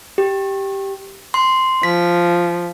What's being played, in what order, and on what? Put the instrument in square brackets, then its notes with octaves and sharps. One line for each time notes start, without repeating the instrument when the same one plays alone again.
[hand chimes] G4
C6
[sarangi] F3 [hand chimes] B6